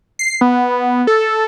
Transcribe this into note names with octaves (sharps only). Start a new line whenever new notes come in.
C7
B3
A4